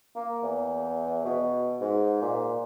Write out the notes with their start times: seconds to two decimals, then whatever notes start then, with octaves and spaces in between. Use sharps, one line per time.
0.16 A#3
0.43 E2
1.25 B2
1.81 G#2
2.22 A#2